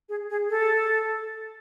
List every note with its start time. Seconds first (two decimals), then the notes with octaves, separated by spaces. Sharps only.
0.09 G#4
0.30 G#4
0.50 A4